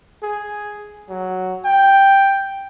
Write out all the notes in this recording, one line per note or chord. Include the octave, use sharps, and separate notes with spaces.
G#4
F#3
G5